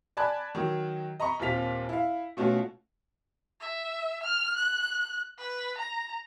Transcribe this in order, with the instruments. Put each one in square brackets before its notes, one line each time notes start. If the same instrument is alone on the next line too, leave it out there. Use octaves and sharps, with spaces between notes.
[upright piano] D5 G#5 A5 B5 F#6 G#6
D#3 F#3
D#5 A#5 B5 C#6
D#2 A#2 C4 F4 B6 F7
E4 F5
B2 A3 C#4 F4 F#4
[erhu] E5
F6
F#6
B4
A#5